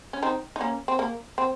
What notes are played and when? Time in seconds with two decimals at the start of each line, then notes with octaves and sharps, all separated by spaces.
0.13 C#4
0.22 C4 D#4
0.56 D#4
0.61 A#3 C#4
0.88 C4
0.99 A#3
1.38 C4